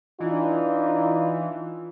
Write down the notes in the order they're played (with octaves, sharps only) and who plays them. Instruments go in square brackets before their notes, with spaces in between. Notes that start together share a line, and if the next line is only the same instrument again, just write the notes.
[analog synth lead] E3 [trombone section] D4 D#4 [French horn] F4